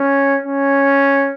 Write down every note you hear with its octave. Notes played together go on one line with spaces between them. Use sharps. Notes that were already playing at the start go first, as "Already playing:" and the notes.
Already playing: C#4
C#4